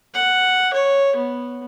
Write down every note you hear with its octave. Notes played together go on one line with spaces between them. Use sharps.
F#5
C#5
B3